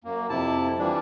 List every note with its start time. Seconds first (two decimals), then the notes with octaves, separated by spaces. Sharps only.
0.04 F#2 A#3
0.29 F2 C3 E4 A5
0.79 E3 F3 G3 D4